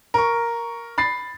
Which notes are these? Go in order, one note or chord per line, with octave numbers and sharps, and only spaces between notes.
A#4 C#6
B5 A6 C7